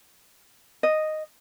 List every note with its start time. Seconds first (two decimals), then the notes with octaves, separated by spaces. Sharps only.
0.83 D#5